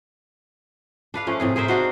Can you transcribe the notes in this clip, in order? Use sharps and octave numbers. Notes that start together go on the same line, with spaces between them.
D4 B4 F5
F3 A3 C#4
A2 C3 G#4
G#4 A#4 C5 E5
D4 D#4 F#4 C5